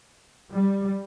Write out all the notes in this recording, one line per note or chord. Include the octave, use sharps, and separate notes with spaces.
G3